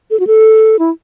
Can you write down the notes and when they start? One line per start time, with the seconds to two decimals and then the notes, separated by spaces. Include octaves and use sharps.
0.11 A4
0.20 F#4
0.27 A4
0.79 E4